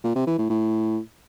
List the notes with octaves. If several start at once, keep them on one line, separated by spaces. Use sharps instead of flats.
A#2
C3
E3
A2
A2